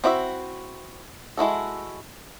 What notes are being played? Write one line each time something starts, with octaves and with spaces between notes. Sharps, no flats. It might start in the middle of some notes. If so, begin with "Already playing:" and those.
C4 E4 F#4 D5 E5
G#3 E4 F#4 A4